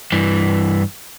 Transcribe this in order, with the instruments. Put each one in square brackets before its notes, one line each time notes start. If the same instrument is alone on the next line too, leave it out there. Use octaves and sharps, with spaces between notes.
[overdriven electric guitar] G2 E3